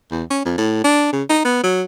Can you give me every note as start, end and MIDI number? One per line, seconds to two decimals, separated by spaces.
0.11 0.23 40
0.31 0.41 61
0.46 0.56 41
0.58 0.80 45
0.84 1.08 62
1.13 1.23 49
1.30 1.44 63
1.45 1.59 59
1.63 1.84 54